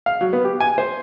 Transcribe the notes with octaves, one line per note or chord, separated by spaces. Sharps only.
F5
F#3
B3
G4
G#5
C5